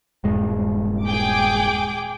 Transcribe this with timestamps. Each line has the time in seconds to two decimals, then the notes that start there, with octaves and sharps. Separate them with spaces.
0.24 D#1 G2 G#3
1.06 G#4 G5 D6